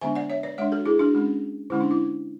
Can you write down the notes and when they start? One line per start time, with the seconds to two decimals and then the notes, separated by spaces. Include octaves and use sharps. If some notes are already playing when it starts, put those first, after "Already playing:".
0.01 D3 G#3 B3 D4 E5 G#5
0.15 D5 F#5
0.30 C#5 E5
0.43 B4 D5
0.58 G#3 D4 C#5 E5
0.72 F#4 A4
0.86 E4 G#4
0.99 D4 F#4
1.14 G#3 C#4
1.70 D3 G#3 C#4 E4
1.81 D4
1.91 E4